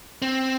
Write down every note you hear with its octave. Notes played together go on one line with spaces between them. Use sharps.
C4